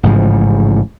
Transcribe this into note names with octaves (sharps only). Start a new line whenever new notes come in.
A1 G#2 C#3 F3